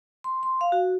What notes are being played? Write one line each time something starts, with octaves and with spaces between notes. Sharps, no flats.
C6
C6
F5
F#4